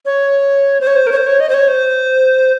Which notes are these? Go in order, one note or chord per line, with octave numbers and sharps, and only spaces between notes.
C#5
C5
C#5
C5
A#4
C#5
C5
C#5
D#5
C5
C#5
C5